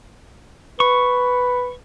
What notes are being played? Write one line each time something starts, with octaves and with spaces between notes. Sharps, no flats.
B4 C#6